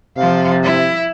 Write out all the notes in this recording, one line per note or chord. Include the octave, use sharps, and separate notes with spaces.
C3 F3 F5
E4